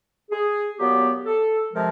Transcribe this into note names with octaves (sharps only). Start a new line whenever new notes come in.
G#4
A#2 F#3 B3 G4
A4
C3 F3 G#3 A#4